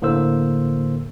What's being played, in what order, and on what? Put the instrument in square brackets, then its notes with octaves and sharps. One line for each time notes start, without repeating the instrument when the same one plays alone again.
[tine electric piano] A2 D3 A#3 C5 E6